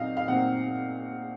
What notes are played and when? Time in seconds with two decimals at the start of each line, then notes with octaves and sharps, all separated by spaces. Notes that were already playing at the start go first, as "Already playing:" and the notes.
Already playing: A#2 F#3 C4 D#4 D#5 F5
0.17 F5
0.28 A#2 F#3 C4 D#4 F#5